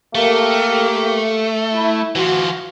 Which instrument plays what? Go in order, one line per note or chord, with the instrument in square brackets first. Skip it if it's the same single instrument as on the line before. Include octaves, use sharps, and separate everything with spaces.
[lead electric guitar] A3 [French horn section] A#3 G4
[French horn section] E4
[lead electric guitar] E3 F4 [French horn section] F#4